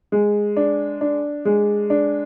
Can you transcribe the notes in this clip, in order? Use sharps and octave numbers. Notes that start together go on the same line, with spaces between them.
G#3
D4
D4
G#3
D4